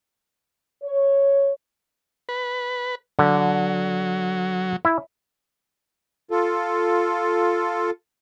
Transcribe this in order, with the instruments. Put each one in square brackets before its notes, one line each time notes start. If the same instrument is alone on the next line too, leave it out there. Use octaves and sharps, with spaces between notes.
[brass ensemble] C#5
[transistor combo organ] B4
[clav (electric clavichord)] D3 [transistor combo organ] F#3
[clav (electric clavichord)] E4
[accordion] F4 A4